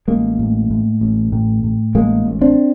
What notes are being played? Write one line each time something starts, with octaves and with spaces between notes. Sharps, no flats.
A1 G#3 A#3
A2
A2
A1
A2
A2
A1 G#3 A#3
A1
C4 D4